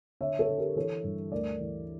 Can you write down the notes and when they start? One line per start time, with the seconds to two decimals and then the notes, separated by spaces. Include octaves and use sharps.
0.20 D3 C#5 E5
0.39 A4 C#5
0.49 D3
0.58 G4 A#4
0.76 E3 A4 C#5
1.04 G2
1.32 D2 A#4 D5
1.60 E3